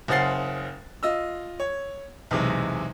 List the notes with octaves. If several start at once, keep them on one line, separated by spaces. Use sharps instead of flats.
F#1 C#3 C5 F#5 A6 C7
F4 D#5 E6
C#5
B1 E2 C3 G#3